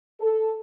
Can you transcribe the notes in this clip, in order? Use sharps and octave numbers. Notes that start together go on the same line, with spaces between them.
A4